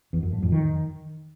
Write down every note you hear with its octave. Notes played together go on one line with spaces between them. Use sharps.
E2
F#2
A2
F2
D#3